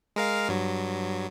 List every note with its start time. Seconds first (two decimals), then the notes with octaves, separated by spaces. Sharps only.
0.16 G#3 A#4 F5
0.49 G2 F#3